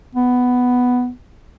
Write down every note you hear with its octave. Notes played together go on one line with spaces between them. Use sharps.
B3